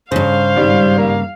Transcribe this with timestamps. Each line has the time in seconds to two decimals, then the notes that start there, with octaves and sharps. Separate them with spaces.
0.12 G2 C#3 C5 F5
0.56 G#1 G3
0.98 A#3